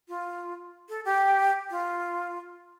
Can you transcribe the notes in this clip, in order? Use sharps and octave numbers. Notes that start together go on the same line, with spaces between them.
F4
A4
G4
F4